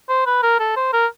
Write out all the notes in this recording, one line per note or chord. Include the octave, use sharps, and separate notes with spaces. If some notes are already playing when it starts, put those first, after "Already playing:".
C5
B4
A#4
A4
C5
A#4